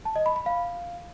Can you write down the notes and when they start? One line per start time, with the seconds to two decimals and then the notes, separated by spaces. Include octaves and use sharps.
0.05 A5
0.16 D#5
0.26 B5
0.36 B5
0.46 F5